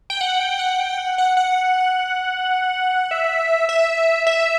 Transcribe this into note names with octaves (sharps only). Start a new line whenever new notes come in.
G5
F#5
G5
F#5
G5
F#5
F#5
F#5
E5
E5
E5